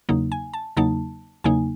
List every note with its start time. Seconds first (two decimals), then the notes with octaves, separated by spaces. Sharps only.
0.09 E2 C#3 F#3 A#3 D#4
0.32 G#5
0.53 A5
0.77 E2 C#3 F#3 A#3 D#4 A5
1.44 E2 C#3 F#3 A#3 D#4 G#5